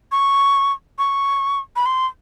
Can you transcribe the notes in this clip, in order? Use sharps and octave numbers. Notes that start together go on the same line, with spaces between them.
C#6
C#6
B5
C6